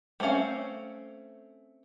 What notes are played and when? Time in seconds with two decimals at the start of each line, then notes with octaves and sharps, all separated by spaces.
0.20 G3 A3 C4 C#4 F5